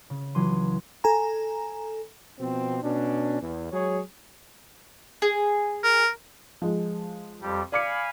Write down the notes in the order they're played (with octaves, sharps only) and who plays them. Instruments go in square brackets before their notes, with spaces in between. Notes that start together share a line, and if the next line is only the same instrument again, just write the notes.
[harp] C#3
C#2 E3 F#3 C6 D#7
[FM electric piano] A4 G#5 A#5
[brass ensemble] B2 F3 C4
B2 C#4 D4
E2
F#3 G#3 G#4 C#5
[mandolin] G#4
[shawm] A#4
[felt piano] F3 G#3
[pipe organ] F2 G3 G4
[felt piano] D5 D6 C#7 [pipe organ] F5 G#5 B5